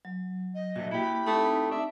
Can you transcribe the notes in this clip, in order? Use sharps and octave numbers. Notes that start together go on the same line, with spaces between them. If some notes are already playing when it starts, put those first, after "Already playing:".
F#3
D#5
A#2 F#3 A3 F#4 E5
A#3 E4 G4 B5
A3 C4 D#4 D#6
D4 E5